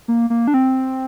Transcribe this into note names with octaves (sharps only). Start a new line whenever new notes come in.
A#3
A#3
D4
C4